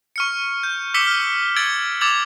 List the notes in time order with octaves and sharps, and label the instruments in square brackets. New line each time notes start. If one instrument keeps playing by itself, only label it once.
[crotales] C#6 F6 C#7
G6
C#6 D6 E6 B6 C#7 G7
F6
E6 G#6 A6 D7 F#7 G7
D6 E6 G#6 A6 F7 F#7